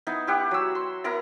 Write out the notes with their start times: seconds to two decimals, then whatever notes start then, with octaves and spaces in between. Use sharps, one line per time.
0.07 B3 D#4 E4
0.27 E4 G4 F#5
0.51 F#3 E6
0.75 C6
1.04 B3 E4 A#4 A#5